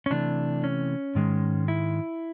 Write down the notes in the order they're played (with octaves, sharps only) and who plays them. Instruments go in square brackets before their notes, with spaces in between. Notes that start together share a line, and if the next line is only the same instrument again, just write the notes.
[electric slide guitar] C#4
C3 E3 A3 D4
C#4
G#2 D#3 G#3
E4